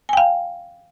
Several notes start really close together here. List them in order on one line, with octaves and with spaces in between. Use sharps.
G#5 G5 F5